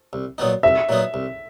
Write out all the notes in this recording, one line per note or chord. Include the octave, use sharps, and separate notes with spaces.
C2
A#2 F#3 B3 D#4
C2 E5
A#2 F#3 B3 D#4
C2